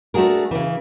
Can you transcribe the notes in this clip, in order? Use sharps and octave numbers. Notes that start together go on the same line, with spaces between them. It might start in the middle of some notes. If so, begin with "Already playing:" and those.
A3 D4 F#4 G#4 A#4
C#3 E3